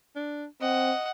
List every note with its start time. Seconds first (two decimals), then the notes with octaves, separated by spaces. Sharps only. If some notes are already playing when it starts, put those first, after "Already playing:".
0.16 D4
0.62 C4 D#5 F#5